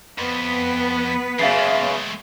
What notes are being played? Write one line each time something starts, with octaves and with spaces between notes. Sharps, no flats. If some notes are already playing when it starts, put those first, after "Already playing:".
F2 B3 B4
F#2 C#3 G#3 A3 F5 A6 C7